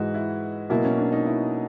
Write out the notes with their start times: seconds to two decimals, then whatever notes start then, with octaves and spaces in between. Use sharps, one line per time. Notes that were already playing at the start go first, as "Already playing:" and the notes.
Already playing: G#2 E3 G#3 F#4
0.14 E4
0.70 B2 F#3 A#3 E4
0.85 C#4
0.98 D4
1.12 D#4
1.26 E4